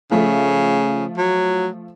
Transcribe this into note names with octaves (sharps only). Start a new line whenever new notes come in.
C#3 F3 A3
F#3